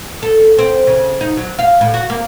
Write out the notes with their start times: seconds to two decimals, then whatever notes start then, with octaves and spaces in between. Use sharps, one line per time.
0.23 A4
0.58 C4
0.87 C#3
1.21 D#4
1.37 F#3
1.59 F5
1.81 A2
1.94 F#4
2.10 A#3